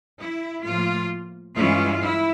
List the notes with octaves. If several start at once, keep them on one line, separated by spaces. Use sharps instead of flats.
E4
A2 F3 A#3 F4
G2 E3 G#3 C#4 E4 F4
E4